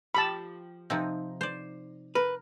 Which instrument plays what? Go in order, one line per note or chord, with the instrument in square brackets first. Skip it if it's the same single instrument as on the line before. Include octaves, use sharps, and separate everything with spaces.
[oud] F3 G4 [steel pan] A5 B5
[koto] C3 F3 C4 [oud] D#4
[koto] C5 D5
[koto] A#4 [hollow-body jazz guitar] B4